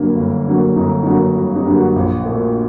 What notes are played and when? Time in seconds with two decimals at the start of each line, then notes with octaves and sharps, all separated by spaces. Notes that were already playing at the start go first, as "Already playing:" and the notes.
Already playing: G1 G2 D3 F#3 A#3
0.17 G1
0.47 G2 D3 F#3 A#3
0.76 G1 D#4
1.03 G2 D3 F#3 A#3 D#4
1.36 G1 F#4
1.56 D#4 G4
1.66 G2 D3 F#3 A#3
1.75 F#4
1.96 A#1
2.25 A#2 A3